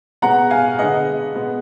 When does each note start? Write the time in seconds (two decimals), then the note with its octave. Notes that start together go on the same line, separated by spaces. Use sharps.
0.22 B2 G#3 B3 F#5 A#5
0.50 F5 G#5
0.79 D3 G#3 B3 D#5 F#5
1.35 B2 G#3 B3